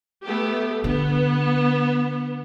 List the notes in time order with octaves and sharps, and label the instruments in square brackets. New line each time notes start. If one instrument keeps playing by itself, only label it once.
[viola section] A3 B3 G4
[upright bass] D3 [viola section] B3